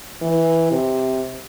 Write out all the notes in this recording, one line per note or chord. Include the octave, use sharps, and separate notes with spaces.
E3
C3